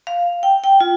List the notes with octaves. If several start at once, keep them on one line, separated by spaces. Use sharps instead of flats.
F5
G5
G5
F4